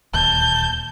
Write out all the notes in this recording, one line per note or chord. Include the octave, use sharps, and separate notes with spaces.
D1 D#2 A#2 A5 G6